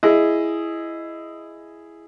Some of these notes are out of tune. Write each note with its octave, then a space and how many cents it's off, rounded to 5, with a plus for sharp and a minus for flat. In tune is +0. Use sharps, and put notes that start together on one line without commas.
E4 +10 G#4 +0 D#5 +5